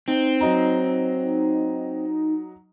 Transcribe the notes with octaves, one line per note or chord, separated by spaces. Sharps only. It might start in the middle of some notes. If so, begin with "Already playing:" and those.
C4 D#4
F#3 D#5 A#5